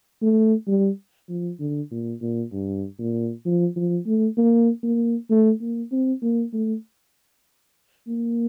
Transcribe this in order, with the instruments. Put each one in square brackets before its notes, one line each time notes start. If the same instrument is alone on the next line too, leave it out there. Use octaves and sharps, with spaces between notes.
[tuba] A3
G3
F3
D3
A#2
A#2
G2
A#2
F3
F3
A3
A#3
A#3
A3
A#3
C4
A#3
A3
A#3